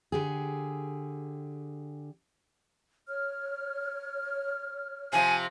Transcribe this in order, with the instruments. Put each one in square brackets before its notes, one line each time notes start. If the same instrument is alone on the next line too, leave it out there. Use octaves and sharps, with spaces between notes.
[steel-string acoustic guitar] D3 G4 G#4
[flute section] C#5 F6
[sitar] C3 F3 [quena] G#5